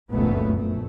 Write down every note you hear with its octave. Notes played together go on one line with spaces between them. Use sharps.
F1 C#2 F#2 A#2 A3 B3
A#1 A3